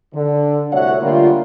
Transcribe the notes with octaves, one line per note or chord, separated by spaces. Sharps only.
D3
C2 A2 F#4 C#5 E5 F#5
D3 G3 A3 A#3 F4